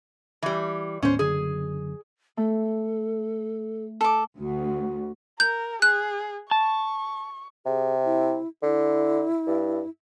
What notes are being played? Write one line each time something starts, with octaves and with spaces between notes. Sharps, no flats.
E3 G3
D#2 A2 B3 C#4 C5
F#1 F#2 D3 G#4
A3 A4
A4 D6
D2 F#4
A#4 G6
G#4 F#6
A5 C#6
C3 G#4
E4
D3 E4
G2